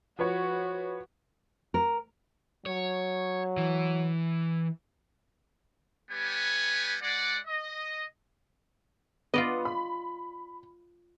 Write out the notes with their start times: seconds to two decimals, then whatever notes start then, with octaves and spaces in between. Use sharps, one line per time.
0.19 F3 F#4 B4 C#5
1.74 A#4
2.66 F#3 C#5
3.57 E3
6.11 G3 B3 G4 B4 C#5 G#5
7.01 G#3 D5 F#5
7.46 D#5
9.34 B3 F4 D5 D#5
9.65 B5